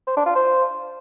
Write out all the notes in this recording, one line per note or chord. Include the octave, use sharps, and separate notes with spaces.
C5
D4
F4
C5